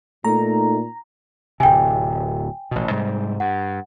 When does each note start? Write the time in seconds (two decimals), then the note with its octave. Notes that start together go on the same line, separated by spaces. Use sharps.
0.24 A#2 A3 D#4 A#5
1.60 D1 C3 G5 G#5
2.71 A1 B2
2.90 G#2 C3 G3
3.40 G2 F#5